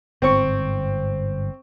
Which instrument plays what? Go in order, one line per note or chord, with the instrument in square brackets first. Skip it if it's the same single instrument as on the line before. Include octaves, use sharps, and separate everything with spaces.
[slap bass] G1 G#2 [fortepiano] C4 C#6